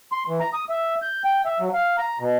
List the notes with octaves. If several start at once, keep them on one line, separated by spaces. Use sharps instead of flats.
C6
E3
A#5
D#6
E5
G6
G5
E5
F#3
F5
A#5
B2